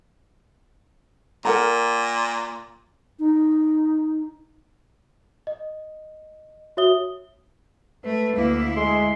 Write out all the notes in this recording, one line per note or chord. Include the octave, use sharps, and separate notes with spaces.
A#2 A#4 F#5 A#5
D#4
D#5
F#4 C#5 E5 D#6 G7
A3 B4
D2 A#3 E4
G#3 C6